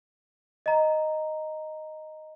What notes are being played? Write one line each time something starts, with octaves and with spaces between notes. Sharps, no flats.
D#5 A#5